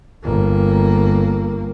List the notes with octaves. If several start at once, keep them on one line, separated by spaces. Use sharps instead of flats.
G1 A#3